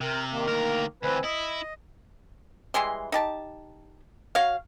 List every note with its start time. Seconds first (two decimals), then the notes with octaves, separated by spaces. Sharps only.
0.01 C3 A#4
0.32 D#3 A#3
0.47 D2 A#4
1.03 D2 E3 C4 B4 G#5
1.24 E4 D#5
2.74 E3 G3 G#3 C6
3.12 D#4 G4 A5
4.35 F#4 C#5 F5